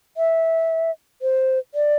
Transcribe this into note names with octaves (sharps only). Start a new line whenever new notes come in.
E5
C5
D5